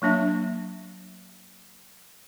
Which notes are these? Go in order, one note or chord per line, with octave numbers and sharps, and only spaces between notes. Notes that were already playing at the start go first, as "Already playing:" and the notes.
F#3 A#3 D4 E5